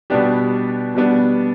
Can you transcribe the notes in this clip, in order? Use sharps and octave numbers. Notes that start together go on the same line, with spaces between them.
B2 G3 B3 D4 G4
B2 G3 B3 D4